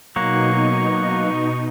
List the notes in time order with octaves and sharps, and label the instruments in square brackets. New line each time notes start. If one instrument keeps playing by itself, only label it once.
[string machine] B2 D#4 [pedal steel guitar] F#3 A#3 [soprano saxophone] C#6